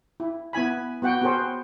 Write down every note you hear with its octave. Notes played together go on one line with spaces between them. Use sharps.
E4
B3 E4 G#5 B5
B3 F#4 F#5 G5
B3 F#4 G#4 A#4 C5 G5